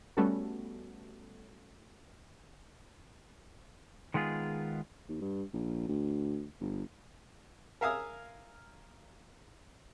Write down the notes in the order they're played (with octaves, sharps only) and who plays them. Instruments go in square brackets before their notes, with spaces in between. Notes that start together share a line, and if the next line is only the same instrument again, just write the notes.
[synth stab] G3 A3 B3 C#4 F#4 A4
[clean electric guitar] D#3 G#3 B3 F4 G#4
[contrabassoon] D#2
G2
A#1
D2
G1
[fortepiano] A#4 E5 F5 G#5 D#6